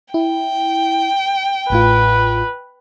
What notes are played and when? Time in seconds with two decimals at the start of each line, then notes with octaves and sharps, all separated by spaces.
0.14 E4 G5
1.70 A1 A2 F4 B4